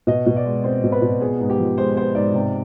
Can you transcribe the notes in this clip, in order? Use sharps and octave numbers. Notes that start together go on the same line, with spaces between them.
B2 D#5
B2
D5
G#3
C4 C5
B2
B4
B2
B3 G#4
G#2
G4
F3
G#3 C5
B3 C5
G#2 D5
C3